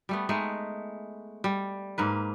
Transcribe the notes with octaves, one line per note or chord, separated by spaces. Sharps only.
G3 A3 B3
G#3 A3 D#4 E5
G3
G#2 A#3 B4